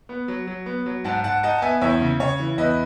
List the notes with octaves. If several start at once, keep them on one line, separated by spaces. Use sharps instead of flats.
B3
F#3
F#3
B3
F#3
G#2 F#5 A5
G#2 F#5 A5
D#4 F#5 A5
A5
B3 E5 G#5
E2 C#5 E5
C#3
C#3 C#5
E3
E2 B4 D#5